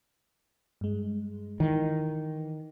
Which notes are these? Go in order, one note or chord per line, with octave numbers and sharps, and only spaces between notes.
G2 G#3
D#3 E3